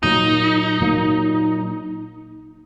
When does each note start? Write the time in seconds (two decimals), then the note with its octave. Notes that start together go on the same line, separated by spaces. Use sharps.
0.03 A#2 F#3 A#3 D#4
0.81 A#2 F#3 A#3